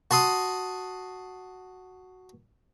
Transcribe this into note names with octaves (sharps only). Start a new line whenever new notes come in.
F#4 A5 C6 D#6